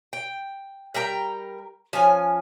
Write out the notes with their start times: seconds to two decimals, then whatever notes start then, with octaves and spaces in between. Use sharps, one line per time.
0.13 G5
0.94 G3 A#4 G5 A#5
1.93 F3 C#4 G#5